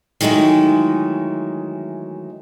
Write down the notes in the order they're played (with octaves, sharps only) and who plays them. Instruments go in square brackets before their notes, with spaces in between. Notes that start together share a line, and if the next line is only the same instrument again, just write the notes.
[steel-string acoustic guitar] D#3 E3 F#3 G#3 A3